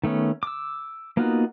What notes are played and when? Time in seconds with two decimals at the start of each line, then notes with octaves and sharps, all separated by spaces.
0.03 D#3 A3 B3 C#4
0.43 D6 E6
1.17 A#3 B3 D#4 F4 F#4